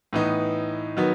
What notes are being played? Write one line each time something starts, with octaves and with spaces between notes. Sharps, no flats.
A2 E3 B3 D#4
D#3 F#3 B3